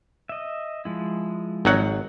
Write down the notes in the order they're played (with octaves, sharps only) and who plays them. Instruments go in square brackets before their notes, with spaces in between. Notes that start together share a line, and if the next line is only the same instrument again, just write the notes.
[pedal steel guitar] D#5 E5
F3 G#3 E4
[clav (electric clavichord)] G#1 F#3 F#5